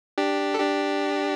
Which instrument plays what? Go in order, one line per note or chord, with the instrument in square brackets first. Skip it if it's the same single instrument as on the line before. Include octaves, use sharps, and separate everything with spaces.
[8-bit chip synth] D4 G4
A4
D4 G4